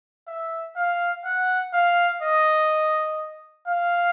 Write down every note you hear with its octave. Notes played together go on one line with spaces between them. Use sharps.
E5
F5
F#5
F5
D#5
F5